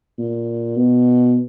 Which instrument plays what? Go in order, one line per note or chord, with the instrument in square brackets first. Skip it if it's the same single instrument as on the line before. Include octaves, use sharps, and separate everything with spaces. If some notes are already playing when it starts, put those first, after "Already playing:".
[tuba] A#2
B2